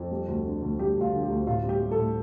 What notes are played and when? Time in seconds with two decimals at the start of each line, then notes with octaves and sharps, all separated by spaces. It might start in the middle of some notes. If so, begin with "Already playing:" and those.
Already playing: F2
0.11 G3
0.28 D2
0.46 D3
0.62 D2
0.79 G3 G4
0.96 D2 F4
1.13 D3
1.24 G4
1.29 D2
1.47 A2 F4
1.63 G3
1.69 G4
1.80 G3
1.91 A4
1.98 A2